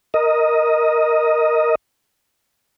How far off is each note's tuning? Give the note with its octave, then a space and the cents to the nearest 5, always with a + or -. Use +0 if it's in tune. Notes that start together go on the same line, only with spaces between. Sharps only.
A#4 +0 D#5 +5